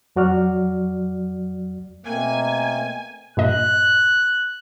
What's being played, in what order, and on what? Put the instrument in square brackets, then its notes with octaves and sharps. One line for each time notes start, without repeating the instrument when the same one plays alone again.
[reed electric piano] F2 F#3 F#4 D5 F6
[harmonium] B2 A3 C4 [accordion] A#3 [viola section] G#5
[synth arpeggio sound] G2 A#2 D#5 [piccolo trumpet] F#6